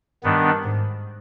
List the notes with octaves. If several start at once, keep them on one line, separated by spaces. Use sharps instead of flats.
G2 D#3 B3 D4
G#2